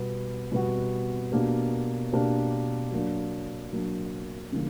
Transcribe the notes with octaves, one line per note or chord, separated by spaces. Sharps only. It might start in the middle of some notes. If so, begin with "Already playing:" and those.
Already playing: B2 G3 B3 F#4
B2 G3 B3 F#4
B2 A#3 D4 G4 A#4
B2 A#3 D4 G4 A#4
F#3 A#3 D4
F#3 A#3 D4
C#3 E3 G3 A#3 D4